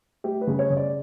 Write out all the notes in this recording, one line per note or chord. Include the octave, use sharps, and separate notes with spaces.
A3 G4
B4
C#3
C#5
C#3
D5